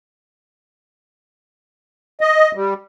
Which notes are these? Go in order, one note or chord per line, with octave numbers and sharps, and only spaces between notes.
D#5
G3